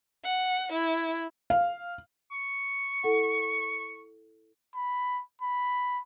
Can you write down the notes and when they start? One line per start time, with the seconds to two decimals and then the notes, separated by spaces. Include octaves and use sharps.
0.24 F#5
0.72 E4
1.50 F5
2.31 C#6
3.03 E4 A4 F#5
4.75 B5
5.41 B5